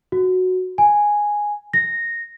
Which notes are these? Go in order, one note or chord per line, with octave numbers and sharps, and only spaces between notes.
F#4
G#5
A#6